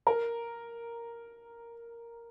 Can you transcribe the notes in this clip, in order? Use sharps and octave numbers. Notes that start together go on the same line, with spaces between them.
A#4